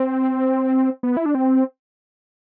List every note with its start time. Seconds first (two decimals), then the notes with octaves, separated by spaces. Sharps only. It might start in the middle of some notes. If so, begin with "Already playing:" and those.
Already playing: C4
1.03 B3
1.17 E4
1.26 D4
1.35 C4